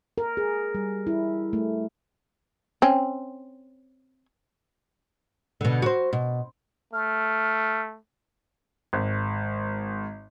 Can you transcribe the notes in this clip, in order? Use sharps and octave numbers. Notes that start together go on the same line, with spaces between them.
A#4
G#4
G3
E4
A3
C4 C#4
B2 D3
F#4 C5
B2
A3 F6
G#1